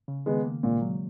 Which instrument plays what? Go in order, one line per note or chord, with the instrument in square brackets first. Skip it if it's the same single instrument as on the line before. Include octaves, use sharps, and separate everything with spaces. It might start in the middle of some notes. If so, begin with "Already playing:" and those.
[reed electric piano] C#3
[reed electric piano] D#3 [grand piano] G#3 B3
[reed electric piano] A#3
[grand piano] A#2 [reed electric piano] G#3
[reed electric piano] F#3